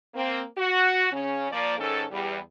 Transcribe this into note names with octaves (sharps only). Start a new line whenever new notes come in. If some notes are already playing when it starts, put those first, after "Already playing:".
A#3 C4
F#4
C#3 C#4
F3 A#3 D5
G#2 D#3 C#4 A4
E2 G3